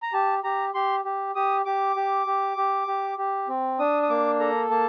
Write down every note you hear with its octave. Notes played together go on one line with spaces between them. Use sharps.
A#5
G4 A5
G4 A#5
G4 C6
G4
G4 D#6
G4 D6
G4
G4
G4
G4
G4
C4
D4 D#6
D#6
A#3 D6
A4 A#5
A#3 A5